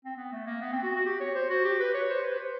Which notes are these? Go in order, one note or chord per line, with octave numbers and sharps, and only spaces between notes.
C4
B3
A3
A#3
B3
C4
F#4
F#4
G4
C#5
C5
F#4
G4
B4
C#5
C5
B4
C5